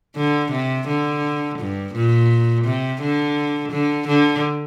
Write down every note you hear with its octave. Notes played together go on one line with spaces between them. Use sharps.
D3
C3
D3
G2
A#2
C3
D3
D3
D3